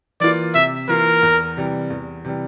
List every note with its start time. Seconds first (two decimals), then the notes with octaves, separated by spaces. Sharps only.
0.20 E3 A#3 F4 D5
0.55 C3 E5
0.88 E3 A#3 F4 A#4
1.22 E2
1.57 C3 E3 G3
1.90 E2
2.25 C3 E3 G3